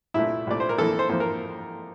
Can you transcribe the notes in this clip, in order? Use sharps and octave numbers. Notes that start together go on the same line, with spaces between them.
C2 A#2 A3 E4
C2 A#2 A3 D5
C5
A#4
F2 E3 A#3 A4
C5
F2 E3 A#3 C5
A#4